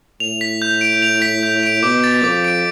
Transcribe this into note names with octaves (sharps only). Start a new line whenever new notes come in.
A2 F7
B6
G6
D7
F7
B6
G6
D7
B2 D6
A6
F2 D6
D7